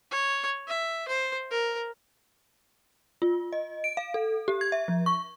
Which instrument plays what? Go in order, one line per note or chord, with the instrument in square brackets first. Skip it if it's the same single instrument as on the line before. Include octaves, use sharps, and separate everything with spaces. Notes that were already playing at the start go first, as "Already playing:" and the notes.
[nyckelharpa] C#5
E5
C5
A#4
[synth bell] F4
D#5
D7
F5
A4
G4
G#6
E5
F3
C#6